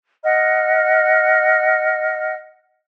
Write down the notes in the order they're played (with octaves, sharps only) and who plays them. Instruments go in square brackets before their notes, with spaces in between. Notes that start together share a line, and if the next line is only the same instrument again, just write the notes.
[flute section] D#5 F#5 F6